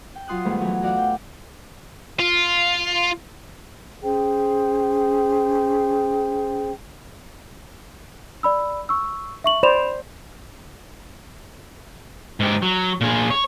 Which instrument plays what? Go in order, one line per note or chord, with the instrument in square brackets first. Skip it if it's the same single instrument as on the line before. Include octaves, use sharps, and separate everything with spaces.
[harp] G5
F#3 F4 C6 D#6 F#6
G#2 D#3 G3 A3 B3
E3 F#3
F#4 D5 F5 F#5
G5
[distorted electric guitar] F4
[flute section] C#4 G#4 C5 G5
[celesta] D5 B5 E6
C#6 E6
E5 C#6 F#7
[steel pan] C5 D5 [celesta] B5 E7 F7
[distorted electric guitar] G#2 G4
F#3
A#2 G#4
C#5